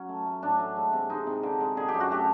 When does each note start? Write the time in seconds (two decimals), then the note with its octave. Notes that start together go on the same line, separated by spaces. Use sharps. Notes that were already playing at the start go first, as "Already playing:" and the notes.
Already playing: F#3 C#4
0.09 A3
0.26 A3
0.42 A2 D4
0.59 A3
0.76 G#3
0.93 C3
1.10 G#3 D#4
1.27 C3
1.43 D3
1.61 G#3
1.77 D3 G#4
1.88 G4
1.94 F#2
2.00 F#4
2.11 A3 G4